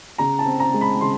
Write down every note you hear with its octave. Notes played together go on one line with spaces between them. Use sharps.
C#3 A#5
A5
C4
A#5
G#3
B5
C#3 C6